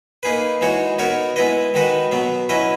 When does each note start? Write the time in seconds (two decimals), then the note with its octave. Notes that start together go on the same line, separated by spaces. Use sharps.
0.23 A#3 D#4 G#4 B4
0.61 E3 G#3 D#4 F#4 C#5
0.99 B3 D#4 F#4 A#4 C#5
1.36 G#3 B3 E4 B4 D#5
1.74 D#3 G#3 D#4 F#4 B4
2.11 B2 F#3 B3
2.49 F#3 C#4 E4 B4 D#5